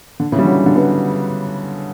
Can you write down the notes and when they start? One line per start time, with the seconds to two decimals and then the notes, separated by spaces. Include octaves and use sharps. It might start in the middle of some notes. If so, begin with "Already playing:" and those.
0.20 D3
0.32 C#3 E3
0.39 G3
0.44 D3 F#3
0.66 D3
0.75 G3 B3